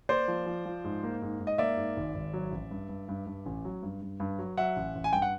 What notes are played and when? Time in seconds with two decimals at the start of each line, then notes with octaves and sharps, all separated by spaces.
0.09 A#3 C5 D5
0.28 F3
0.46 F3
0.66 F3
0.84 G#2
1.03 A#3
1.22 G#2
1.40 G#2
1.47 D#5
1.58 A#3 D5 E5
1.77 G#2
1.97 G#1
2.15 G#1
2.33 F#3
2.52 A1
2.71 G2
2.89 G2
3.09 G2
3.27 G2
3.46 A1
3.65 F#3
3.83 G2
4.02 G2
4.20 G2
4.39 F#3
4.57 F#3 E5 F#5
4.76 A1
4.95 A1
5.04 G#5
5.13 G2 G5
5.22 F#5